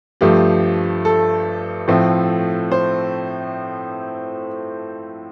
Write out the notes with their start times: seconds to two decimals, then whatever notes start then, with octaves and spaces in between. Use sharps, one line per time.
0.21 G2 F3 A3 G4
1.05 A4
1.88 A2 F3 A3 C4
2.72 C5